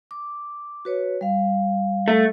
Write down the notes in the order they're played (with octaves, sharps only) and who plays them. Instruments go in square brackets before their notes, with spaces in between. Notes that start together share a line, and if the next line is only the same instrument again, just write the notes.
[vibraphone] D6
F#4 B4 C#5
G3 F5
[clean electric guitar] A3